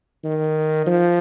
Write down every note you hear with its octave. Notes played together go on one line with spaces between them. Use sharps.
D#3
F3